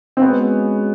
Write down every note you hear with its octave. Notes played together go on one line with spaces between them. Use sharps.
C4
G#3 B3 C#4 F#4